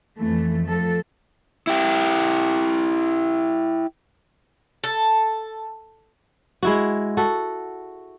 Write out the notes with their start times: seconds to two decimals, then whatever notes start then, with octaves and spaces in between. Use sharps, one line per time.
0.19 F2 E3 A3
0.66 F3 A4
1.67 E4 G4
4.84 A4
6.63 G#3 E4 F#4
7.17 F#4 A4